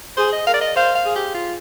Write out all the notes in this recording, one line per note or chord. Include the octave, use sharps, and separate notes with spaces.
G#4 C5
D#5
A#4 F5
D5
D#5
C5 F5
F5
G#4
G4
F4